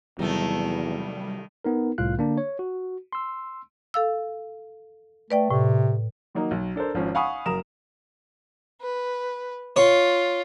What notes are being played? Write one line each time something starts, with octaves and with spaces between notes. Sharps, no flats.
E2 C3 D#3 F#3 G3 A3
B3 D#4 A#4
C2 A2 F4 F5 F#6
D3 A#3 D4
C#5
F#4
C6 E6
A4 F5 E6
A3 B4 D5 G5
A2 C3
D#3 F#3 A#3 D#4
B1
D4 A4 A#4 C5
G#1 F3 C#4
F5 F#5 G#5 B5 C#6 D#6
F#1 F#2 A#4 A#5 D#6 E7
B4
F4 C#5